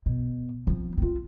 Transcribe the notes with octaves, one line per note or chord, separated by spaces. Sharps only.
B2
F3 C4
C4 F4